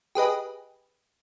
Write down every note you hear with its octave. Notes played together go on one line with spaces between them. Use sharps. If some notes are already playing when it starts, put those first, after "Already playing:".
G4 G#4 B4 D#5